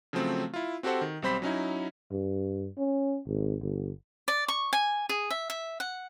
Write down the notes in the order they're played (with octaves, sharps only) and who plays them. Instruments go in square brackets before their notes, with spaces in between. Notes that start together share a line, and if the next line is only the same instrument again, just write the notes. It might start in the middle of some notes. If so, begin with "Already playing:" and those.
[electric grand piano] C#3 F3 F#3 A3 C4
E4 F4
C4 F#4 G4 A4 C5 F#5
D#3
B1 G3 C4 C5 B5 B6
F#3 C#4 D#4 E4
[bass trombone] G2
C#4
G#1
G1
[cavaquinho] D5
C#6
G#5
G#4
E5
E5
F#5